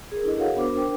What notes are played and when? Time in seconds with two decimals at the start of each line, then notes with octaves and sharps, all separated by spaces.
0.12 G#4 A#4
0.24 D4 E4 A4 D#5
0.37 F#4 G#4 A#4 C#5 F5 F#5
0.56 B3 D4 F#4 A#4 C5 D6
0.75 D4 A#4 C5 G5 D6